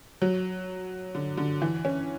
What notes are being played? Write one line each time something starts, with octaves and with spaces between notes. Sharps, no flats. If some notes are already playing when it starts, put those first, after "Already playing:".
F#3
D3
D3
E3
C#4